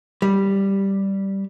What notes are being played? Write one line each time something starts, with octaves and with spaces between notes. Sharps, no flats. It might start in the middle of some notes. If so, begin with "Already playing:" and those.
G3